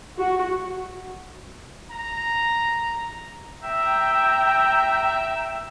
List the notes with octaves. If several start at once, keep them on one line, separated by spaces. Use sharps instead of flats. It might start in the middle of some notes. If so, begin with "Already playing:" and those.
F#4
A#5
E5 G5 A#5